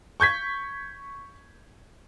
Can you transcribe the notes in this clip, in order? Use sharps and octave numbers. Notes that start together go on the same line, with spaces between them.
C#6 G6 G#6 B6